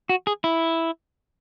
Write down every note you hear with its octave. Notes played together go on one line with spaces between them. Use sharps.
F#4
G#4
E4